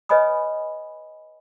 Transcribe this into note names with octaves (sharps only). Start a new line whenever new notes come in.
B4 C#5 D#5 G#5 B5 D#6